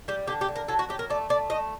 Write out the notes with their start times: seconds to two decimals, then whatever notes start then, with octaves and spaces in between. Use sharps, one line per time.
0.08 G3 G4
0.27 D3 G4
0.41 G4
0.48 D3
0.56 A#4
0.68 F#3 A4
0.79 F#4
0.89 F#3 G4
0.99 A#4
1.10 A3 D5
1.29 A3 D5
1.50 A3 D#5